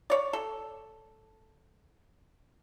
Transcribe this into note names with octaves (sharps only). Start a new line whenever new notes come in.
C#5 D5
A4